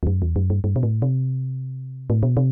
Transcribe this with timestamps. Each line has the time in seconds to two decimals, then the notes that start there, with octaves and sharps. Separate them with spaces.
0.03 E2
0.07 F#2
0.22 E2
0.36 F#2
0.50 G2
0.64 G2
0.76 B2
0.83 A2
1.02 C3
2.10 A2
2.23 B2
2.37 C3